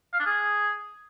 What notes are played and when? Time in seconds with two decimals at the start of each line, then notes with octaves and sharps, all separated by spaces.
0.13 F5
0.20 D4
0.26 G#4